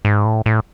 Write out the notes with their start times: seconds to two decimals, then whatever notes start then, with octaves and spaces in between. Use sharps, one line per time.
0.05 G#2
0.25 A2
0.46 A2